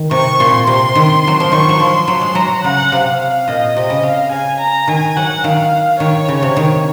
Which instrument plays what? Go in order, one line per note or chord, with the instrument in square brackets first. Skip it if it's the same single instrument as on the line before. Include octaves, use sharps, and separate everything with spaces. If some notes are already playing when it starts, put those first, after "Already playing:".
Already playing: [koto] D#3
[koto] C3 [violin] C#6
[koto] A#2 [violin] C6
[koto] C3 [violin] C6
[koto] D#3
F#3
F3
[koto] D#3 [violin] C#6
[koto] F#3
[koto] F3 [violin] C6
[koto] F#3 [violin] C6
[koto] G#3
[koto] F#3 [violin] A#5
[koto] C#3 [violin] F#5
[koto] C3 [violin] F5
[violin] F5
[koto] A#2 [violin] D#5
[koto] C3 [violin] D#5
[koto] C#3
[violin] F5
[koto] C#3 [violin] G#5
[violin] A#5
[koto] D#3 [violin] G#5
[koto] F#3 [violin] F#5
[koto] D#3 [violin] F5
[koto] D#3 [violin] C#5
[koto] C#3
C3
D#3